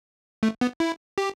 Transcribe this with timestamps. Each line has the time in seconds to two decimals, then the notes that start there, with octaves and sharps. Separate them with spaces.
0.43 A3
0.61 B3
0.80 E4
1.18 G4